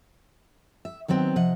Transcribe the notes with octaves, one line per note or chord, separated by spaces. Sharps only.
E5
D#3 F#3 B3 C4
C3 F3 D#5 F#5